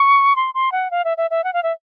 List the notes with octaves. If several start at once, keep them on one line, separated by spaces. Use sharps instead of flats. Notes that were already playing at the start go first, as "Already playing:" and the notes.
Already playing: C#6
C6
C6
F#5
F5
E5
E5
E5
F#5
F5
E5